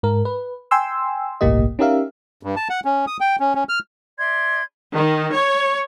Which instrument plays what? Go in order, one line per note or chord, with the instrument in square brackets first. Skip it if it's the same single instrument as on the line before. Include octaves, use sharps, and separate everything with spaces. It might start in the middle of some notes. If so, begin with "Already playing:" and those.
[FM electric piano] G#2 A#4
B4
G5 G#5 C6 E6
G1 C2 A2 A#3 G4 D#5
C#4 D#4 G4 A#4 E5 F5
[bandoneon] G2
A5
F#5
C#4
D#6
G5
C#4
C#4
F6
[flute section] D5 E5 C6 G#6
[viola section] D#3
C#5